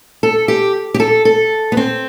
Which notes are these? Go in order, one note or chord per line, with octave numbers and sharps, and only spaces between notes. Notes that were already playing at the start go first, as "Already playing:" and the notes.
A4
G4
G4
A4
A4
B3
C4